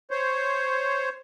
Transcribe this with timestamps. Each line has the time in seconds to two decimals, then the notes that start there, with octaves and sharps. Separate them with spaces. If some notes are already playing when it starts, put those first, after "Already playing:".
0.11 C5 C#5